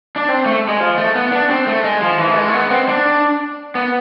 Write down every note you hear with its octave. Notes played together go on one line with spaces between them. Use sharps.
D4
C4
A3
G#3
F3
A3
B3
D4
C4
A3
G#3
F3
E3
A3
G#3
A3
B3
C4
D4
B3